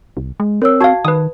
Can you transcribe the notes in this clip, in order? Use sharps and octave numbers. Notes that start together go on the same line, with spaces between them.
C2
G#3
C4 A#4 C#5 E6
F#4 F5 A5 G#6
D#3 B4 D#6